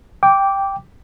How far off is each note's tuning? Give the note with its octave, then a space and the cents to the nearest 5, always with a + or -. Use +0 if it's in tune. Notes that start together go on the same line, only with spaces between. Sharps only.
G5 +5 D6 -10